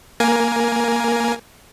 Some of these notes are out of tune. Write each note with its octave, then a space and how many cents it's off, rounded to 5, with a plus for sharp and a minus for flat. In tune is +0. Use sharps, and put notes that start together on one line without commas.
A#3 +0 A#4 +15 G#5 +0